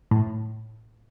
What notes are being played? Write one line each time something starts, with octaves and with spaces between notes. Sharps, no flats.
A2